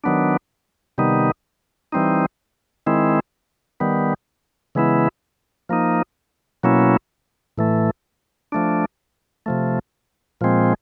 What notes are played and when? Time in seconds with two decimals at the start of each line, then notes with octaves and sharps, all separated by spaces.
0.04 D#3 F#3 B3 D4
0.98 C3 D#3 G3 B3 D#4
1.92 E3 G3 C4 D#4
2.86 D#3 G#3 C4 E4
3.80 D#3 G3 B3
4.75 C#3 E3 G#3 B3 E4
5.69 F3 A#3 D#4
6.63 B2 F#3 A#3 C#4 E4
7.58 A2 E3 A3
8.52 F3 A3 D4
9.46 C3 F3 A3
10.41 A#2 F3 G#3 C4